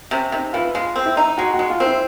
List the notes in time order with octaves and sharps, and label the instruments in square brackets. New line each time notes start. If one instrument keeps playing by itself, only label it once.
[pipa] C3 [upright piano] C#4
[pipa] C3 [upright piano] D#4
[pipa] E3 [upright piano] F4
[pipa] G#3 [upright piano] F4
[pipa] C4
[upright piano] E4
[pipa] D#4
[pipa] G#3 [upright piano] F#4
[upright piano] F#4
[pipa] G#3
[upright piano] F4
[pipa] C4
[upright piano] E4